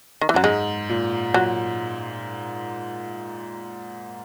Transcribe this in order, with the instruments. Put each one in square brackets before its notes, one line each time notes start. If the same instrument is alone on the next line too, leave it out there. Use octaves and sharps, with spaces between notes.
[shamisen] D#3
E3
[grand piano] F#2 [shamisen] F#3
[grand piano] G#2 [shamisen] G#3
[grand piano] A#2
[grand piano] A#2 [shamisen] F#3